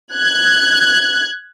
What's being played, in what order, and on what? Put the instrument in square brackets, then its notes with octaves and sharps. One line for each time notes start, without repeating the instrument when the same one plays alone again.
[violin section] F#6 G#6